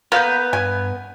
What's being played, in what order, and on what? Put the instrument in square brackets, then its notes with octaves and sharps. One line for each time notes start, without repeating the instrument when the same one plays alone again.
[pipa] A#3 [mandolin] B3 B4 G6
[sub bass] G2 [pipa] G#5